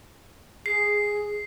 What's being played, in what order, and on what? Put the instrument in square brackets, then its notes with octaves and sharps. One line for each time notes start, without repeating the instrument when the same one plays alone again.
[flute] G#4 [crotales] C7